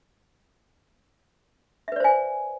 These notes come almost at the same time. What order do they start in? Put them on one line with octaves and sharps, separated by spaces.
E5 B4 D5 C5 G#5